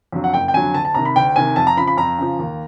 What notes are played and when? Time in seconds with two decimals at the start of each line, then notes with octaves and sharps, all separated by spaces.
0.12 F2 D3 F#3
0.24 F#5
0.34 F#1 G5
0.48 G5
0.54 F2 D3 F#3 G#5
0.74 D2 A5
0.85 A5
0.94 C3 D#3 A#5
1.05 B5
1.16 D2 G5
1.36 C3 D#3 G#5
1.56 F2 A5
1.67 A#5
1.77 C#3 F3 B5
1.87 B5
1.97 F2 A#5
2.18 C#3 F3
2.39 D#2